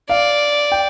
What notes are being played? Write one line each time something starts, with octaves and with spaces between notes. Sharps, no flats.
D5 F5
G5